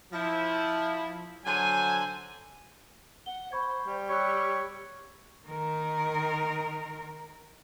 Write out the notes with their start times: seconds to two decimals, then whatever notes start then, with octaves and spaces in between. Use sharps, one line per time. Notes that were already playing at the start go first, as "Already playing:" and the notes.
0.13 F3 E4
1.45 D3 F#3 C5 G#5
3.26 F#5 G7
3.52 C5 B5 C#6 G#6
3.85 G3
4.09 G4 C#5 B5 E6 F#6
5.47 D#3 A#4